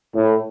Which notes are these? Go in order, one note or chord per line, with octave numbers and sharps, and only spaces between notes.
A2